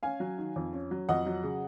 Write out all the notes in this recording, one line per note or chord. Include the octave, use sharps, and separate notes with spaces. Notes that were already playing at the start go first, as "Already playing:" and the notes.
C#4 F5 G#5
F#3
D#3
F2
C#4
F#3
F2 D#5 F#5
F#3
C#3